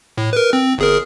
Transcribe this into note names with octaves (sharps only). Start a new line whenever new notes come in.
A2
A#4 B4
C4
G1 G#4 A#4